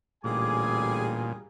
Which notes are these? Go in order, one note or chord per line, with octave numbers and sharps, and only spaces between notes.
A1 D2 A#2 G3 G#4 G#5 D6